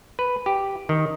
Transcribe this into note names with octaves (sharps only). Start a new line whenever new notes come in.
B4
G4
D#3